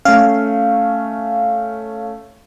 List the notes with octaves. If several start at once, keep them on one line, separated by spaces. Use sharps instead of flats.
A3 C#4 F5